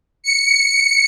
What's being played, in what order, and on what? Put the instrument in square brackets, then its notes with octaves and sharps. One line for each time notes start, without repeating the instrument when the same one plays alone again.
[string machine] C#7